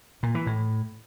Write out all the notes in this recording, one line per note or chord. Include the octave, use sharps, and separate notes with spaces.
A#2
E3
A2